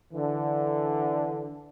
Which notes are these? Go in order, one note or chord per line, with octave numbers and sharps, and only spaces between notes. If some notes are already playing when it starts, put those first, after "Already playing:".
D3 E3